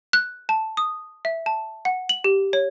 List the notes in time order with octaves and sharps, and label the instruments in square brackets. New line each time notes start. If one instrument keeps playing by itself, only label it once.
[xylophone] F#6
A5
D#6
E5
A5
F#5
F#7
G4
C#5